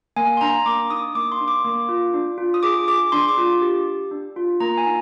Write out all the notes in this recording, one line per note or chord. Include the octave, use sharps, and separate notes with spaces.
A#3 G#5
C6
D4 A#5
A#3 D6
D#4 D#6
A#3 D6
C6
D4
D6
A#3
F4
D4
F4
D#6
G#4 D6
G#4 D6
D4 C6
D6
F4
G4
G4
D4
F4
A#3 A#5
G#5
D#4